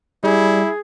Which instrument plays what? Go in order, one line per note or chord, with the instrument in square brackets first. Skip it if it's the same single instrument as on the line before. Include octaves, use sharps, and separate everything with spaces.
[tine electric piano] G3 [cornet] E4 [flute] G#4